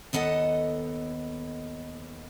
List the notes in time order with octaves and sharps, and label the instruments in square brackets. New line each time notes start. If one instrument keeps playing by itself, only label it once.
[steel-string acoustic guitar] D#2 B3 A4 D#5 F#5